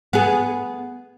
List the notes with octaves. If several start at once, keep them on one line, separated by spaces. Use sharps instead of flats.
B3 G#4